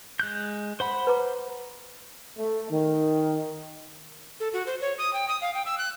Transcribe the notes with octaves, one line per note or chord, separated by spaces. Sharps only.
G#3 F#6 G6
C5 F#5 B5
B4 A#5 D6
A3
D#3
A4
F#4
C5
C#5
D#6
G5
D#6
F5
G5
E6
F#6